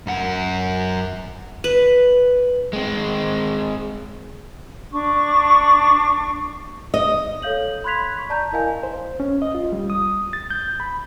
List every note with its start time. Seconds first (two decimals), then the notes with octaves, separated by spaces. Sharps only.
0.07 F#2 F#5
1.64 B4
2.73 G#3 C4
4.92 D4 C#6 D6
6.94 D#5
7.42 A4 C#5 F5 G6 F#7
7.84 B5 C6 F#6 G#6 B6 F7
8.17 C#6 B6
8.30 D5 A5 A#5 G6
8.52 E4 A#4 D#5 F5 G#5
8.83 C5
9.20 C#4
9.42 D#5
9.55 F4
9.72 G3
9.90 D#6
10.33 A6
10.50 G6
10.80 B5